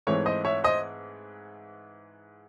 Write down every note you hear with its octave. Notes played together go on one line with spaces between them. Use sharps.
G#2 E3 A3 C4 C#5
C5 D#5
C#5 E5
C5 D#5